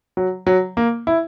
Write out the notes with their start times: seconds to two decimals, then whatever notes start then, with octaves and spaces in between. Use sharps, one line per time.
0.17 F#3
0.47 F#3
0.77 A#3
1.07 E4